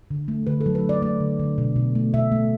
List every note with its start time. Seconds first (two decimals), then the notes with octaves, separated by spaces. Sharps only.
0.11 D3
0.28 A3
0.47 D3 B4
0.61 A4
0.66 F#3
0.75 B4
0.84 A3
0.89 D5
1.02 A3 D5
1.20 D3
1.40 D3
1.58 B2
1.76 B2
1.95 A3
2.14 B2 E5
2.32 A3